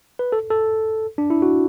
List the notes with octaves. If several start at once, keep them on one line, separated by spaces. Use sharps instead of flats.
B4
A4
A4
D4
E4
F#4